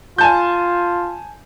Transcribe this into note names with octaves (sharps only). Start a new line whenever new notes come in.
F4 G#5 A5 G6